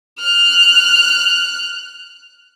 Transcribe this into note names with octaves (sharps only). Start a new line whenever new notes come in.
F6 F#6